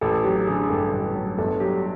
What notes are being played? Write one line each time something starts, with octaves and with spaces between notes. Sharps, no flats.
A1 A4
F#3 G4
D3 G#4
G2 A4
A1
F#3
G1 A4
F#3 G4